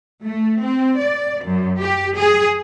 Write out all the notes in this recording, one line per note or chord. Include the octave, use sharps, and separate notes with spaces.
A3
C4
D5
F#2
G4
G#4